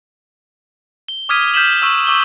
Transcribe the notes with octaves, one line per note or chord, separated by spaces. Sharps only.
G7
D6 D#6 F6 G#6 B6 D#7
F6 G6 B6 E7 F#7
C#6 E6
C#6 D6 E6 G7